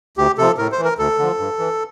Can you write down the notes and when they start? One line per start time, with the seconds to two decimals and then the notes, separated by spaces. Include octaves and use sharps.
0.17 D2 G4
0.38 C3 F3 A4
0.58 A2 A#4
0.72 C5
0.79 E3
0.84 A#4
0.98 D2 A4
1.19 D3 F3
1.39 G2
1.59 E3